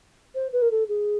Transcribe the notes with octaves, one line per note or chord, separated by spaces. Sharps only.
C5
B4
A#4
A4
G#4